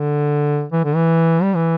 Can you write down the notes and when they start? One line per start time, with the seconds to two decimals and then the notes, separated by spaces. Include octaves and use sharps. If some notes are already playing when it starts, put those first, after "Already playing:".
Already playing: D3
0.72 E3
0.84 D3
0.95 E3
1.42 G3
1.55 E3